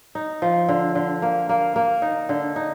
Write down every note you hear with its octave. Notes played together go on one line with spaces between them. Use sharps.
D#4
F3
D3
D3
A#3
A#3
A#3
D#4
D3
D#4